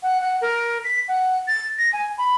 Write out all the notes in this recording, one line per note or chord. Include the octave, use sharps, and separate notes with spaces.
F#5
F#5
A#4
B6
F#5
A6
A#6
G#5
B5